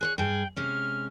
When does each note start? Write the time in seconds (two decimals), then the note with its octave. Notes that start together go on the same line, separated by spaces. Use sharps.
0.01 G#4 C5 C#5 F#6
0.18 G2 G#4 G5
0.56 C3 G#3 C#4 F6